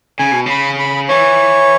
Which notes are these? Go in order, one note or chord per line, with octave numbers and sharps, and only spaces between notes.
C#3 G#5
B2
C#3 B5
B5
E3 C#5